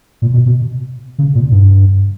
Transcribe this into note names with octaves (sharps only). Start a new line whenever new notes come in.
A#2
B2
B2
C#3
A#2
G2